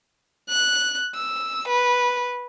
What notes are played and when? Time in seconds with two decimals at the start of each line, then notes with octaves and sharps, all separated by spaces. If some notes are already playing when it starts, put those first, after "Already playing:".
0.49 F#6
1.15 E6
1.68 B4